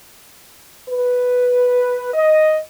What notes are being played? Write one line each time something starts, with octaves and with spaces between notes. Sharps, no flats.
B4
D#5